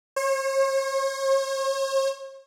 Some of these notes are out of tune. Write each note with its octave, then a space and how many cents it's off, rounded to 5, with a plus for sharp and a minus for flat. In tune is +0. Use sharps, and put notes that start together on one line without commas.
C#5 -45